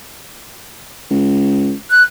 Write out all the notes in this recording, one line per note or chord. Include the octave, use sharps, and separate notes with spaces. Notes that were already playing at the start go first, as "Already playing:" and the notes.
C#2
F#6